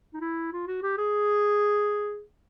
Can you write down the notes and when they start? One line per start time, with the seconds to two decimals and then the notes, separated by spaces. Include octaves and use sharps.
0.14 D#4
0.21 E4
0.53 F4
0.67 F#4
0.83 G4
0.98 G#4